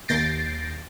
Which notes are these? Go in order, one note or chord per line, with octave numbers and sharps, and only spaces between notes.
D#2 G6 A6 A#6 C7 D7